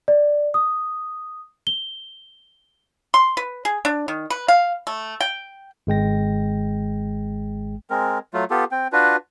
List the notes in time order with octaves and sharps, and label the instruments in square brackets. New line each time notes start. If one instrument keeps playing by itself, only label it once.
[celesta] D5
D#6
G7
[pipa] C6
B4
G#4
D4
D#3
B4
F5
A3
G5
[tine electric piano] G#1 G#3 G5 A#6
[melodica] G#3 C4 A#4
F#3 A3 F4
B3 F4 G4 A4
C4 G5
D4 F4 F#4 B4